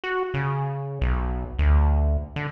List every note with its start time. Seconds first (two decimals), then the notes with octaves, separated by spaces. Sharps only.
0.04 F#4
0.34 C#3
1.01 B1
1.59 D2
2.36 D3